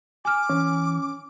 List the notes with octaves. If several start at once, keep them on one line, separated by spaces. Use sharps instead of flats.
G#5 D6 F6
E3 C#4